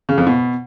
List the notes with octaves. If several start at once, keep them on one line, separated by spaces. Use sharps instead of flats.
C#3
F2
B2